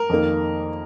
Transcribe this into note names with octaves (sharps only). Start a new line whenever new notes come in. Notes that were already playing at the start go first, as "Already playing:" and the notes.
Already playing: A#4
F2 D#3 A#3